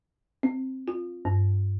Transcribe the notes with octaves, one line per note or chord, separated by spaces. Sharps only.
C4
F4
G2